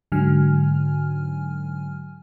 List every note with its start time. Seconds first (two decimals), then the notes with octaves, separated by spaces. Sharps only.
0.12 G#2 D3 F#3 G#5 F6